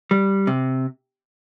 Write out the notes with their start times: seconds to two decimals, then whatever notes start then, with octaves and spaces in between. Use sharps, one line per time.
0.11 G3
0.47 C3